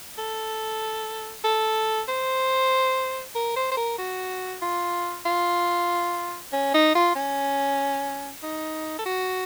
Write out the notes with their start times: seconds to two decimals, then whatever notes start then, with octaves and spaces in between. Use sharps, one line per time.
0.18 A4
1.45 A4
2.08 C5
3.35 A#4
3.57 C5
3.72 C5
3.77 A#4
3.98 F#4
4.62 F4
5.26 F4
6.53 C#4
6.74 D#4
6.95 F4
7.16 C#4
8.43 D#4
8.99 A4
9.06 F#4